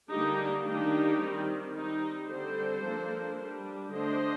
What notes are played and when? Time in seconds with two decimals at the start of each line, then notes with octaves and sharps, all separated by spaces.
0.11 D3 G3 A#3 D4 D#4 G4
0.66 D#3 A#3 D4 D#4 G4
1.20 D#3 G3 C4
1.75 G3 C4 D#4
2.29 D3 G3 C4 A4 C5
2.84 F3 A#3 D4
3.39 G3 D4
3.93 D3 A3 D4 C5 D#5